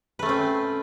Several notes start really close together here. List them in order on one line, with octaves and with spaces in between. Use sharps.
B4 A3 C#4 C4